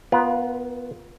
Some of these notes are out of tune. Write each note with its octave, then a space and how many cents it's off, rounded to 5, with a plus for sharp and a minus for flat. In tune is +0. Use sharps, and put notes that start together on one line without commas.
B3 +0 F4 +0 A#4 +35